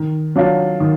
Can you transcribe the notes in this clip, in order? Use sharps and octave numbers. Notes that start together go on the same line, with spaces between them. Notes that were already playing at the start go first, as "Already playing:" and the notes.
Already playing: D#3
F#3 D4 F4
D#3